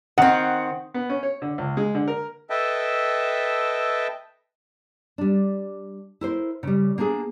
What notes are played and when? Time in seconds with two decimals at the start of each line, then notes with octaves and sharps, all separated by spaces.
0.18 D#3 C4 F#5
0.94 B3
1.10 C#4
1.23 C#5
1.42 D3
1.58 C#2
1.77 G#3
1.95 D3
2.08 A#4
2.50 A4 B4 D#5 E5 G5 A5
5.18 G3 D4
6.21 E4 A#4 C5
6.63 C#3 G3
6.98 A#3 B3 D4 G4 G#4